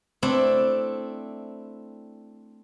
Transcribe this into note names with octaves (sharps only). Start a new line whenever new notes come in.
A3 C4 D4 E4